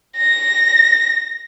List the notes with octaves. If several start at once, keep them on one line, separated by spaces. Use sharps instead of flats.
A#6